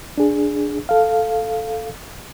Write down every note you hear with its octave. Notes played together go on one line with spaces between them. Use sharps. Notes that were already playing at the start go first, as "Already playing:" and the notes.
D4 G#4
A4 F5